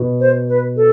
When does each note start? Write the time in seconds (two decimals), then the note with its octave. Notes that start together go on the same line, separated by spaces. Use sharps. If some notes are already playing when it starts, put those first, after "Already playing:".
Already playing: B2
0.20 C5
0.49 B4
0.76 A4